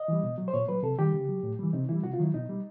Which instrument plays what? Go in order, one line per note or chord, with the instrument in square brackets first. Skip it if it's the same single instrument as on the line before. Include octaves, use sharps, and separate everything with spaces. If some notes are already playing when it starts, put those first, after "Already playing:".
Already playing: [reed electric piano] D#5
E3 G3
B2
F#3
C5
A#2 C#5
F#3 B4
C3 A4
D#3 G3 G4
C#3
F#3
A2
E3 G3
C3 D#4
E3 G3 E4
C3 F#4
F4
D#3 F#3 E4
B2 D#4
G3